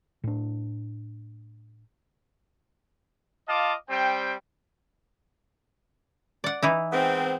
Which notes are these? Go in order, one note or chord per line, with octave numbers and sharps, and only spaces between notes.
A2 D4
F4 D#5 F5 A5 D6
G3 C4 G5
D5 F#5
E3 D#4 E4
G#2 B3 C4